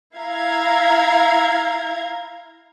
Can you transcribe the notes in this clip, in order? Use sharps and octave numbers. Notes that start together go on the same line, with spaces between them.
E4 F5 A#5 G#6